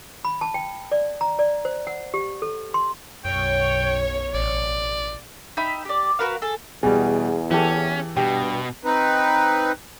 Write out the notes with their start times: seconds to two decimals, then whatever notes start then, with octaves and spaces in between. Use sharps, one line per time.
0.25 B5
0.41 A5
0.54 G5
0.92 D5
1.21 A#5
1.39 D5
1.65 C5
1.87 F#5
2.14 G4
2.42 A4
2.74 C6
3.25 B1 F#2 C#5 G5
4.34 A1 D5
5.57 D#4 E5 G5 B5
5.85 G4 D5
6.19 F#4 A#4 B4 F5
6.42 G#4 A4
6.83 E2 B2 G3 G#4
7.51 E3 C#4 G4 A4
8.17 G2 B2 G4
8.85 C4 D#4 B4